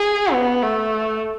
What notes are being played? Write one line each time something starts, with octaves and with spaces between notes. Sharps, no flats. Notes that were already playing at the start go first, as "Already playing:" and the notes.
Already playing: G#4
B3
A3